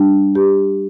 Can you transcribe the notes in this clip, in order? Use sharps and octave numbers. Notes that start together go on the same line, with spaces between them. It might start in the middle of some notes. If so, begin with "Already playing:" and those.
Already playing: G3 D4
G4